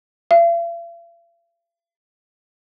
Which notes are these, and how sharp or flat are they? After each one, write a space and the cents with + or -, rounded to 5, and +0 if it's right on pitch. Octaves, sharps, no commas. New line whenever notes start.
F5 -45